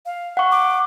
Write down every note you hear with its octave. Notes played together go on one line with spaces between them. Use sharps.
F5
F#5 C#6
D6